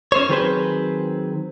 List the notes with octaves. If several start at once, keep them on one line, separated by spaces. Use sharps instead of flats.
C#4 C5 C#5
D#3 F#3 C4 G#4 B4 C5